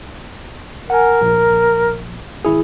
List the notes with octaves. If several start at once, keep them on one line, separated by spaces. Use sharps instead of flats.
A#4 F#5 G#5
A#1
G#1 E4 G#4